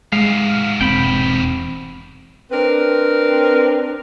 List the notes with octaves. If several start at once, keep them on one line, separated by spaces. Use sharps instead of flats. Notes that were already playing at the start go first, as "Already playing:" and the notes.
G#2 C3 G#3 F5
E1 C4 G5 B5
C4 D4 A#4 B4